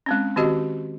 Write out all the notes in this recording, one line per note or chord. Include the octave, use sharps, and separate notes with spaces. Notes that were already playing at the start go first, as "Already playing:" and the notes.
G#3 C4 C#4
D#3 C4 F#4 G4 D#5